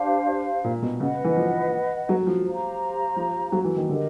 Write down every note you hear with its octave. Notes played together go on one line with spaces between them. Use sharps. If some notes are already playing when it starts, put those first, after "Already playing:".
Already playing: D4 G4 C5 F5
A#2
B2
C#3 B4 D#5 F#5
E3
F3
F#3
F3
G4 C5 F5 A#5
F3
F#3
E3
D#3
D3 G4 A#4 D#5